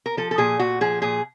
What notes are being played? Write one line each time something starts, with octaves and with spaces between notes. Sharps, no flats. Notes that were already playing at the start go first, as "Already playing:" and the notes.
A#4
F3 A4
A4
A#2 G#4
A#2 F#4
F3 G#4
A#2 G#4